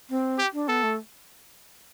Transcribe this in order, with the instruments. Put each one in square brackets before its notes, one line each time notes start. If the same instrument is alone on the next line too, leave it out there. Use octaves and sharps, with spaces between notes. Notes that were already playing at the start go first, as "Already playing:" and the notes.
[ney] C4
[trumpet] G4
[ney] D4
[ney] B3 [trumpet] A4
[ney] A3